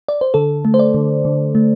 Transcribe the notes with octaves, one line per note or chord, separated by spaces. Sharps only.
D5
C5
D3 A4
A3
C5
D5
D3
D3
A3